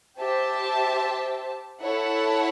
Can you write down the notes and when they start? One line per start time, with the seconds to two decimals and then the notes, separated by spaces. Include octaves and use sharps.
0.18 G4 C5 E5 A5
1.82 E4 A4 C#5 F#5 A5